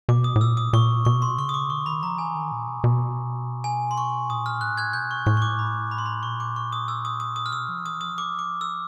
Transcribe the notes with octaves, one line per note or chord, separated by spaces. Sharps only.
B2 D6
D#6
A2
A#2 E6
D#6
A#2 C#6
B2 C#6
C6
C#3 C#6
D#6
D6
D3 C#6
D#3 B5
F3 A#5
E3 G#5
D#3
A#2
B2
B2
G#5
C6
C#6
A#2 D#6
F6
A2 F#6
F#6 G#6
B2 G6
C#6
A2 C#6
C#6
D6
B5
B5
C6
B5
A#2 C#6
D6
C#6
D#6
E6
D#6
D#6
D#6
F6
B2 E6
F3
E3 D#6
F3 D#6
D6
D6
E6